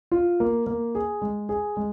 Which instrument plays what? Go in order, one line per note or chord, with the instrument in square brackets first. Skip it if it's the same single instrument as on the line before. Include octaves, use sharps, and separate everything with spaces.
[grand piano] F4
A#3
A#3
G#4
G#3
G#4
G#3